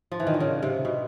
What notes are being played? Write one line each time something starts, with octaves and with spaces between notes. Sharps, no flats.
F3
E3
D#3
D3
C#3
C3
B2